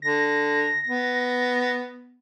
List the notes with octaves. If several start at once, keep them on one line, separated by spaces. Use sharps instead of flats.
D3 A#6
B3